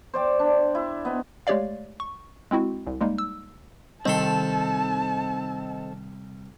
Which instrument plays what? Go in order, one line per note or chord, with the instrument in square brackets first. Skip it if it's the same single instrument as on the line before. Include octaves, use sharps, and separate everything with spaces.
[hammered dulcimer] C5 D5 G5 D6
D4
E4
B3 D#4
[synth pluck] G#3 A3 G4 C#5 D5 F5
C#6
G#3 C4 E4 F#4
C2
G3 G#3 A#3 D#4
E6
[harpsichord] C2 B5 C6 [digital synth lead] D#3 [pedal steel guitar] C4 A4 [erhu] A5